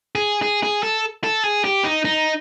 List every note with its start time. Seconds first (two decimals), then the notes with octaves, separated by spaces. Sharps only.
0.15 G#4
0.42 G#4
0.63 G#4
0.83 A4
1.24 A4
1.44 G#4
1.64 G4
1.84 D#4
2.05 D#4